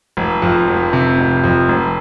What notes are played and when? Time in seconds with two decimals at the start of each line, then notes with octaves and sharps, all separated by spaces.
0.17 F1
0.42 F2
0.68 F1
0.93 C3
1.18 F1
1.44 F2
1.69 F1